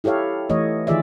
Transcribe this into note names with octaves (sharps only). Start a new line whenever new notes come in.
E4 G4 A4 C#5 F5
E3 A3 C#5 D#5
D#3 E3 F4 G#4 D5 E5